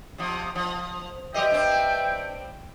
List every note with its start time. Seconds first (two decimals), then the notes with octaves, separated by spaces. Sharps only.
0.18 C3 F3
0.55 F3
1.34 F#3 G4 B4 D#5 E5 G5
1.50 G2 C4